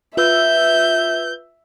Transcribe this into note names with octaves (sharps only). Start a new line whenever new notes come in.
F4 B4 E5 E6 G6